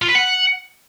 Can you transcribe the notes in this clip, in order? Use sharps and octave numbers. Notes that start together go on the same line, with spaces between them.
F4
B4
F#5